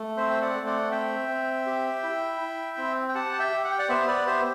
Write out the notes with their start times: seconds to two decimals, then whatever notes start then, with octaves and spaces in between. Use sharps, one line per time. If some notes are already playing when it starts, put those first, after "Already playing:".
Already playing: A3
0.17 C4 C5 E5
0.30 G5
0.42 D5 F#5
0.54 A3
0.67 D5 F#5
0.91 C4 E5 G5
1.28 C4
1.66 G4
2.03 E4
2.41 E4
2.78 C4
3.09 G5
3.15 G4 F#5 A5
3.33 A5
3.40 E5 G5
3.52 G4
3.64 F#5
3.71 G5
3.79 D5 F#5
3.89 B3 C5 E5
4.08 B4 D5
4.26 G4 C5 E5